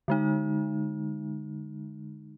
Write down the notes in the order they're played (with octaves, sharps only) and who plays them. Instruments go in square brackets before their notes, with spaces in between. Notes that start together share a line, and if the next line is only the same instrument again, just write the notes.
[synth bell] D3 G#3 D#4